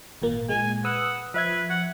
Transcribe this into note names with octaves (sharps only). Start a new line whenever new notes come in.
G#1 A#2 A#3
A#2 G#3 G#5
B4 F#5 D#6 E6
F3 B4 E5 G#6
F#5